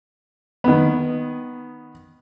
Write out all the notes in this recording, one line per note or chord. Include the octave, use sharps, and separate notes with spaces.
D#3 B3